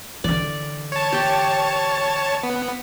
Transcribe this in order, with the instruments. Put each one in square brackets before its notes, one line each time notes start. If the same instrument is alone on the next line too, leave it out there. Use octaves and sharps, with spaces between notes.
[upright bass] D3 E3 [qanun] D5
[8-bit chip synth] C#5 A5
[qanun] G4 G5
[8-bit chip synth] B3